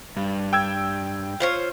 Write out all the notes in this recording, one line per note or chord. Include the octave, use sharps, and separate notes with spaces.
G2
G5 E6 G#6
F4 C5 C#5